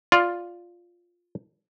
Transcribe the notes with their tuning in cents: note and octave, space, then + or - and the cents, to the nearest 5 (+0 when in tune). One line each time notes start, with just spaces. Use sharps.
F4 +0 D5 +0